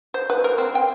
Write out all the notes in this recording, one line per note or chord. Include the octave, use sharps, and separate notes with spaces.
C5
B4
A#4
C4
G5